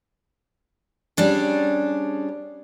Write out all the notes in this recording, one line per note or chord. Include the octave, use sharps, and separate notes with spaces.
G3 C#4 D4 G#4